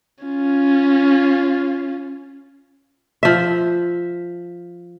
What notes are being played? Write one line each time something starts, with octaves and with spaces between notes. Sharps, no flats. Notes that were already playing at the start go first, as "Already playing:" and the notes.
C#4 F4
F3 E5